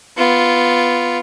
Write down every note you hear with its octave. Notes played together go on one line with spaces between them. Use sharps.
B3 F4